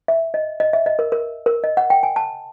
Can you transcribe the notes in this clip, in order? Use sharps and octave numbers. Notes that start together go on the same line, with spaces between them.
E5
D#5
D#5
E5
D#5
A#4
A#4
A#4
D#5
F#5
G5
G#5
A5